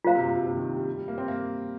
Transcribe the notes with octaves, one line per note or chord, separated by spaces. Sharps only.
A#2 F4 C5 F5 A#5
C3
G2
A#2
C3
C3
D#3
G3
G3
A#3
C4
A#3